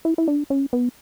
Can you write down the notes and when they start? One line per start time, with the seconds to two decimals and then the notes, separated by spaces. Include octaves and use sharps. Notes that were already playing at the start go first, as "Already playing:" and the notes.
0.05 E4
0.18 E4
0.28 D4
0.50 C#4
0.73 B3